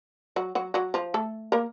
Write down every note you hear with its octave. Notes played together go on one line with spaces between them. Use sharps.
F#3 F#4
F#3 F#4
F#3 F#4
F3 F4
A3 A4
A#3 A#4